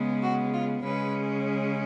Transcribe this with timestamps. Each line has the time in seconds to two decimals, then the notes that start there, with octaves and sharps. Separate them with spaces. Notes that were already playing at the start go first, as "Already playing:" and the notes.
Already playing: C#3 G#3 B3
0.22 F#4
0.53 F4
0.83 C#3 G#3 C#4 B4